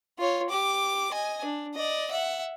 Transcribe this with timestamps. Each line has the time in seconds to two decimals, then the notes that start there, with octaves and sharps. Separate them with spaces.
0.19 F4 C#5
0.50 G4 D6
1.12 D#5 G#5
1.44 D4
1.74 D5 D#5
2.11 E5 F#5